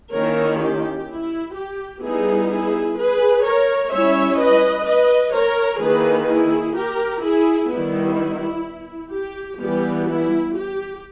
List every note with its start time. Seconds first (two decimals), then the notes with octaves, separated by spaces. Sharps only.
0.12 D#3 A#3 C#4 E4 A#4 C#5
0.60 G4
1.08 E4
1.54 G4
2.02 G3 B3 D#4 E4 G#4
2.50 E4 G#4
2.97 G#4 B4
3.44 A#4 C#5
3.91 G3 C#4 E4 C#5 E5
4.39 B4 D#5
4.86 B4 D#5
5.33 A#4 C#5
5.80 D#3 A#3 E4 G#4 B4
6.28 E4 G#4
6.75 G4 A#4
7.22 E4 G#4
7.70 D#3 G3 B3 E4
9.12 G4
9.59 E3 G3 B3 G4
10.07 E4
10.54 G4